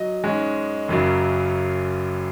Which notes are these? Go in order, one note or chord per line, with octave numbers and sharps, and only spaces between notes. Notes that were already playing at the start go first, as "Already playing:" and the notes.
Already playing: F#3 D#5
G#2 G#3 C#4
F#1 F#2 C#3 F#3